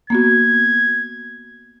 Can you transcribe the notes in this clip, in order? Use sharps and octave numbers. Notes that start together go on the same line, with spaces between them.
A#3 B3 F#4 G#6